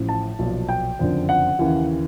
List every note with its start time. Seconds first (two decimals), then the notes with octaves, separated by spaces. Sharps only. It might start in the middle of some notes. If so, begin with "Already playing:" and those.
Already playing: A1 A2 F3
0.09 A5
0.39 B1 A#2 F3
0.69 G5
0.99 F#1 F2 D3 F3
1.29 F#5
1.59 D#2 C#3 E3